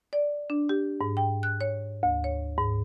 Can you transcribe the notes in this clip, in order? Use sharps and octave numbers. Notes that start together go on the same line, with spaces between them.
D5
D4
G4
G#2
G5
F#6
C#5
D2
C#5
G#2